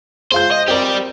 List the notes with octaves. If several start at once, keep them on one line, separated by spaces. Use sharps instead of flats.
G#3 F4 C5 G6
D#5
C4 G4 A#4 D5